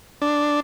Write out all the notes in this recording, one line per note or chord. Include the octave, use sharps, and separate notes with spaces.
D4